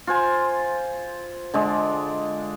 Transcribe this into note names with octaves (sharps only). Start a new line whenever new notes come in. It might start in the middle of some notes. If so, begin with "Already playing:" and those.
F4 C5 G#5
D3 G#3 D5